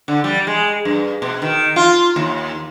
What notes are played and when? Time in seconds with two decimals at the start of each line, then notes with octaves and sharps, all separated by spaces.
0.08 D3
0.24 G3
0.47 G#3
0.85 G2
1.22 B2
1.42 D#3
1.76 F4
2.16 D#2